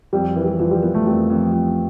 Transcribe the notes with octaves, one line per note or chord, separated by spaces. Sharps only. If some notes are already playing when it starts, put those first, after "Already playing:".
F2 G3
E3
G3
E3 F3
G3
E3 B3
A3
F2 G3
F2
F2